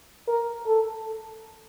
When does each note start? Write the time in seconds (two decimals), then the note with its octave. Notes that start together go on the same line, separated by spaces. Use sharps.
0.28 A#4
0.66 A4